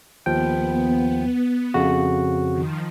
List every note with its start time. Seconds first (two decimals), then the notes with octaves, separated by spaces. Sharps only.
0.26 D#2 F3 B3 G5
1.74 F2 C#3 F#4
2.52 D#3 F3